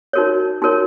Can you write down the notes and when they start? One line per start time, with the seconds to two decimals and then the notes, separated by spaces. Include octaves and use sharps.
0.13 D#4 F#4 A#4 C#5
0.62 D#4 F#4 A#4 C#5